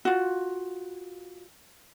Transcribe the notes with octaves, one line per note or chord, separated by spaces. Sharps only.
F4 F#4